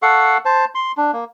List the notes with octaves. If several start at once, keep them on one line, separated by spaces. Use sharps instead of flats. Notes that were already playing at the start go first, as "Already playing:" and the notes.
A4 F5 F#5 C#6
C5 A5
C6
D4
A#3